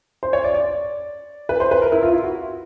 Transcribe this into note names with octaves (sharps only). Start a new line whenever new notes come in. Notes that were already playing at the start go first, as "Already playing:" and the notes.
C5
C#5
D5
D5
B4
C5
B4
A#4
E4
F4
E4
F#4